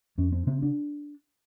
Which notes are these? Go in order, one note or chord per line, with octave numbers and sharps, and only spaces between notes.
F2 C#4
C4
C#3 C4
D4